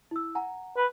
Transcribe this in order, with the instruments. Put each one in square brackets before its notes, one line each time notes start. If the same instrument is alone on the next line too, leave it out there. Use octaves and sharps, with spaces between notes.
[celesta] E4 E6
F#5 G#5 A#5
[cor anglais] B4